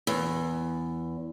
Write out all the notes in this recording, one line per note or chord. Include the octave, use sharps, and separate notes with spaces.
E2